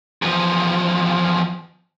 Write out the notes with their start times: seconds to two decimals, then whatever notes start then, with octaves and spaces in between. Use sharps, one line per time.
0.22 E2 F3